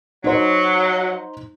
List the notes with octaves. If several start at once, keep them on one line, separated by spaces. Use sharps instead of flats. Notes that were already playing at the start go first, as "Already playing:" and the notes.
F#3 D#4 C5